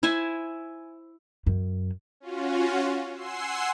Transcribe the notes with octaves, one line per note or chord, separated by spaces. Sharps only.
E4 C5 E5 G#5
F#2
C#4 F4 F#4
F#5 G#5 C6 E6 C7